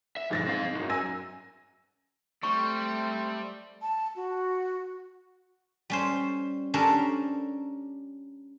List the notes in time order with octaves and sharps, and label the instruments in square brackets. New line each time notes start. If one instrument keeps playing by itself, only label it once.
[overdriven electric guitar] E5
[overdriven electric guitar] B1 F2 [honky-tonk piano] G#2 A6 A#6
[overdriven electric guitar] C4 F5
C2 F#2
[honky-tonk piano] G#5 E6 A#6
[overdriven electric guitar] G3 [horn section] A3 [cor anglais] C4 [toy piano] C#6
[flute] A5
F#4
[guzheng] G3 C#4 C5
C#4 D4 G4 A4 A#4 C5